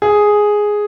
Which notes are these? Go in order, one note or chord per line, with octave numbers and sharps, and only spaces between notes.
G#4